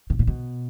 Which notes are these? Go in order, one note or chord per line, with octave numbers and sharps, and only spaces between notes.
B2
A#2
B2